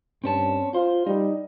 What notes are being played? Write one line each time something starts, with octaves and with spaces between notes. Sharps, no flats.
G2 C4 C#4 A5
F4 C5
G3 D#4